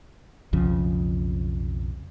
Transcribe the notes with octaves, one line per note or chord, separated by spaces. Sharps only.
B1 F2 C#3 F3